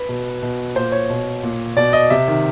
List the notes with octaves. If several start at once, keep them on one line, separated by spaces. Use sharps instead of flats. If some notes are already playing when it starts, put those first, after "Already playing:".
Already playing: B4
B2
B2
A#2 C5
C#5
B2
A#2
B2 D5
D#5
C3 E5
D#3